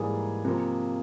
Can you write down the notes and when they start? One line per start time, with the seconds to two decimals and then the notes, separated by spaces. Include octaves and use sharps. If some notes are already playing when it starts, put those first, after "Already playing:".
Already playing: G#2 E3 G3 A#3 G#4
0.45 C3 F3 A#3